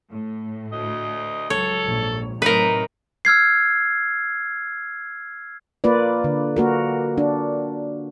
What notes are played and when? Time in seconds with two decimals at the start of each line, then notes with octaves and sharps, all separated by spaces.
0.12 A2
0.72 D2 D#5
1.50 C#2 F#3 A4 C#5
1.86 A#1 G#2
2.42 A2 C3 F#3 D#4 A#4 B4
3.25 E6 F6 G#6 C7
5.84 A#3 F4 B4 D5
6.24 D3
6.57 A#3 F#4 A#4
7.18 D4